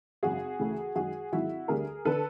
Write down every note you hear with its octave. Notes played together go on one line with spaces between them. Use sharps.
G#1 F#2 C#3 F#4 G#4
D2 C#3 E3 A3
F#2 D#3 G#3 F#4 G#4
G#1 G#2 D#3 F#3 E4 F#4
D2 D3 G3 G#4 A#4
D3 A4 B4